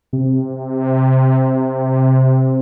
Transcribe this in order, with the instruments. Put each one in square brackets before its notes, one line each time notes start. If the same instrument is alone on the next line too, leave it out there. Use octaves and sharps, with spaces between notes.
[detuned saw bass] C3